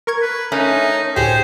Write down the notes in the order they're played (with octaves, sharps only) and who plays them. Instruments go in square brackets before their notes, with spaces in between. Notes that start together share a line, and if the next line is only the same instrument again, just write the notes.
[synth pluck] A#4 C#6 G#6
[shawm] B4
[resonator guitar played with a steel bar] A3 C#4 [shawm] D#4 [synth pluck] A#4
[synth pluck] D2 A2 [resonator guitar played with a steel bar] G4 G#4 [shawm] C5